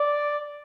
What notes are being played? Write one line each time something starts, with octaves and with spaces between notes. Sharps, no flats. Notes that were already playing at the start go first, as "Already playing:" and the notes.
Already playing: D5